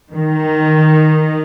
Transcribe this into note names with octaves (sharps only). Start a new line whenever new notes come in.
D#3